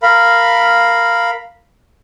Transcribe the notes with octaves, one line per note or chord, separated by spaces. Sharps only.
A#4 F5 B5